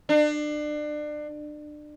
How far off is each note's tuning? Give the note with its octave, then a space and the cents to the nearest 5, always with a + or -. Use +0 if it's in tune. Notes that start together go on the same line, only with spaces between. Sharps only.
D4 +30